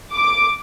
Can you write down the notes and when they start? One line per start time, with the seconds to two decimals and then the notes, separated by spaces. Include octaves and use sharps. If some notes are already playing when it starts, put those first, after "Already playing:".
0.14 D6